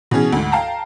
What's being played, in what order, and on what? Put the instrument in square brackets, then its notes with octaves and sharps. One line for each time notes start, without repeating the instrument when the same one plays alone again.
[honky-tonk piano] B2 E3 C#4 G#4
D2 G#2
F5 G5 A5 A#5